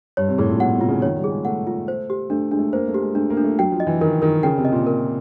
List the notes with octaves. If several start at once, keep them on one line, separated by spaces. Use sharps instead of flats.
G2 C#5
C3
A2 G#4
A#2
B2 F#5
C3
F4
C#3
D#3 C#5
G3
G#4
G#3
A3 F#5
F4
C5
G4
A3 D4
G#3 D4
A3
A#3 C5
A3
G4
G#3
A3 D4
A#3
D4
A3
F#3 G5
F3
D#5
E3
D#3 A#4
D#3 A#4
C#3 G5
C3
D#5
A#2
A#4